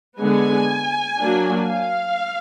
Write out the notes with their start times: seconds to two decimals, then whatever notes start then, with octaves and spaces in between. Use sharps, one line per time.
0.20 D3 G#3 B3 G#5
1.19 F#3 A#3 D4
1.68 F5